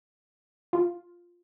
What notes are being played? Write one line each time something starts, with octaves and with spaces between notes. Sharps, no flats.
F4